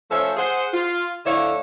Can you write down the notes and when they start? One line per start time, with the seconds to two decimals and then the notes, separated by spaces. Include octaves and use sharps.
0.10 F3 A3 C#4 A4 C5 E5
0.37 G#4 C5 F#5
0.73 F4
1.26 D3 F3 A3 E4 C#5 F5